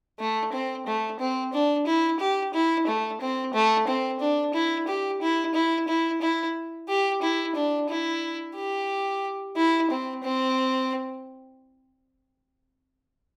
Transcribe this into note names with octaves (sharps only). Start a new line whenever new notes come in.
A3
C4
A3
C4
D4
E4
G4
E4
A3
C4
A3
C4
D4
E4
G4
E4
E4
E4
E4
G4
E4
D4
E4
G4
E4
C4
C4